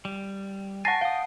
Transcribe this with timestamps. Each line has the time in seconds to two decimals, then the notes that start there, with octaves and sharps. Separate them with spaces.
0.05 G3
0.85 F#5 G#5 A5 C#6 A6 A#6 C7
1.01 F5 G5 D#6